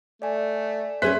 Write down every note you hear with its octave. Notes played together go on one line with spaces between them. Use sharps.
A3 D5 G#5
C#4 G#4 B4 C5 E5 F#6 B6